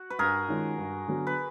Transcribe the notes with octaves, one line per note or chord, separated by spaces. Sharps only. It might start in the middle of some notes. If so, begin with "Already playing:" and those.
Already playing: F#4
B4
G2 G#4 A#4
D#3 G#3 C#4 F4
G2
D3 F#3 B3
B4